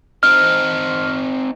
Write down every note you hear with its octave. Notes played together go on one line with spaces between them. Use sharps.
C4 D#4 F6